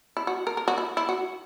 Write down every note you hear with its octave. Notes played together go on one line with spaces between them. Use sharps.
E4
F#4
A#4
A#4
F#4
E4
E4
F#4